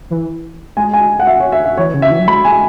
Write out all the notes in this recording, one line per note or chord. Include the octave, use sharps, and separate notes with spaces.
E3
G#3 G#5
G#5
F#5
E5
C#5
E5
E5
E3 C#5
C#3
E5
E3
F#3
G#3 B5
G#5